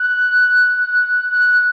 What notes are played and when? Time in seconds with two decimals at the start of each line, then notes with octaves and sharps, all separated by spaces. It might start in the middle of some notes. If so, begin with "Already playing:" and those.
Already playing: F#6
1.30 F#6